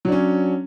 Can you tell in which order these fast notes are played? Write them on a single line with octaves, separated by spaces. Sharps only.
F#3 D4 C#4